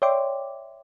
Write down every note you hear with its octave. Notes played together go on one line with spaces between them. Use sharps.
C#5 D5 E5 G5 C6 D6